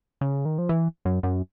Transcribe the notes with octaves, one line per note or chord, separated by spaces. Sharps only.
C#3
D#3
F3
E3
F#2
F#2